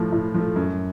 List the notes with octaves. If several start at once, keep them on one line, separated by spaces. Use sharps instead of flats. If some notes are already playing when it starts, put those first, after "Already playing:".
Already playing: A2 F3 A3
A2
F3 A3
F#2